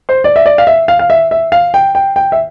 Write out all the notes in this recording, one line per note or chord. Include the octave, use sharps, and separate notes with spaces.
C5
D5
E5
D5
F5
E5
F5
F5
E5
E5
F5
G5
G5
G5
E5